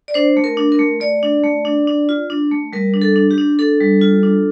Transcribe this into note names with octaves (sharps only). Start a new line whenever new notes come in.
D5
D4 C5
A3
A#4
D4
A#4
A3
A3 D5
D4
A3
D4
D4
F4
D4
A3
G3 A#4
D4
A4
D4
G4
D4
D4 A4
G3
F4
D4